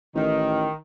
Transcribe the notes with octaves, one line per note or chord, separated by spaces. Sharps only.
A1 D#3